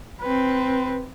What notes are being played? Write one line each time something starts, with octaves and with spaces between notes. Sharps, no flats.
C4 B4